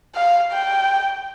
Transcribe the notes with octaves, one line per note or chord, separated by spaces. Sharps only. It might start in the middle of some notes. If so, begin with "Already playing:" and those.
F5
G5